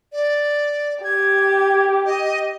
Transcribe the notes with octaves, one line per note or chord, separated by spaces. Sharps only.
D5
G4 G#6
D#5